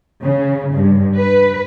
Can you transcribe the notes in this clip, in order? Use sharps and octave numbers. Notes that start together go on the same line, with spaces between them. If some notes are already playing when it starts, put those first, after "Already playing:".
C#3
G2
B4